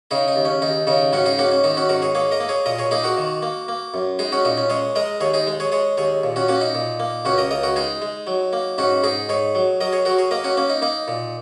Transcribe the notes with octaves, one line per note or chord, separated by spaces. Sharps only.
C#3 D#4 G#4
D#4
D#2
C#4
D#2 D#4
C#3 D#4
G#2 C#4 F#4
D#4 G#4
A#3 C#4 F#4
C#4
D#3 D#4
C#4 F#4
G#2 F#4 A#4
G#4 C#5
A#3 G#4 C#5
A#4 D#5
A#3
G#4 C#5
A#2 A#4 D#5
G#4 C#5
A#3 D#4 G#4
F#4 A#4
D#3
A#3
A#3
F#2
G#3 D#4 G#4
C#4 F#4
A#2 D#4
C#4
G#3 G#4 C#5
G#3 A#4 D#5
D#2 G#4 C#5
D#4 G#4
G#3
G#4 C#5
G#3 G#4 C#5
D#2 G#4 C#5
A#2
C#4 F#4
A#3 C#4 F#4
D#4
A#2
A#3
C#2 C#4 F#4
A#4 D#5
C#2 A#4 D#5
F#4 A#4
G#3 D#4 G#4
G#3
F#3
A#3
G#2 C#4 F#4
G#2 D#4 G#4
G#2 G#4 C#5
F#3
F#3 A#4 D#5
G#4 C#5
F#3 F#4 A#4
G#4 C#5
A#3 A#4 D#5
C#4 F#4
A#3 C#4
D#4
A#3 D#4
A#2